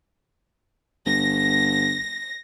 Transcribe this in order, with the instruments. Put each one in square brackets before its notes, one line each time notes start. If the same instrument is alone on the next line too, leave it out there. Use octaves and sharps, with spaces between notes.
[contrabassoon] G1 [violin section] A#6